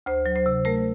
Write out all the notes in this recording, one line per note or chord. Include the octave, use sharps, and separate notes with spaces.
D2 C5
F#3
C5
C3
A3 A#4